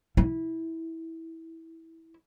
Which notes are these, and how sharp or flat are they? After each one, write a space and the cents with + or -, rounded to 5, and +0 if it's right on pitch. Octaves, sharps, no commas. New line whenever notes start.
E4 -15